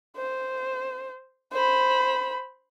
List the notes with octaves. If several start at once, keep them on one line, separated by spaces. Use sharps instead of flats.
C5
C5 B5